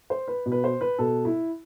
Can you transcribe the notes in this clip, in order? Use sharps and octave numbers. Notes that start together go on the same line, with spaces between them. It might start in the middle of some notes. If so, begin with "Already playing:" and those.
C5
B4
B2
B4
C5
B4
B2 A4
E4